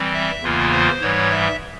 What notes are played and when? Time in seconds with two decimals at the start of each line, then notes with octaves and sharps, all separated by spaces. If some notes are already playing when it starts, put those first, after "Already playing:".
Already playing: E3 G3 C4
0.13 E5
0.43 E2 C#3 E3 A#3 F4
0.72 C5
1.01 G#2 E3 G3 C#5
1.31 E5